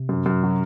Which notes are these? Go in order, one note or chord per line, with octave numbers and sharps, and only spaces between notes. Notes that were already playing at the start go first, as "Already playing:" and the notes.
Already playing: C3
F#2
F#2
F#3